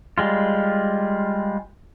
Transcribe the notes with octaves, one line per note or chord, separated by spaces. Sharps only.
G3 G#3 F4